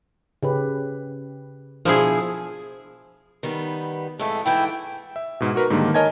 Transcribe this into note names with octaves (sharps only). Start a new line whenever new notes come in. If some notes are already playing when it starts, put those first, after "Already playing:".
C#3 G4 B4
B2 F3 D4 E4 G#4
D#3 G3 B3
F2 A2 G#3 A3
G#2 E3 A3 E4 G5
E5
G#2 B2
F#4 A#4 B4
G#2 D3 D#3 G3 A#3
A#4 C#5 D#5 G#5 A5 G#6